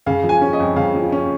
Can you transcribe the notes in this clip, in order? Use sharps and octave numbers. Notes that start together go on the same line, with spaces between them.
C#3 F5
F3
G#5
C#4
D#5
F2
C#3 F5
F3
C#4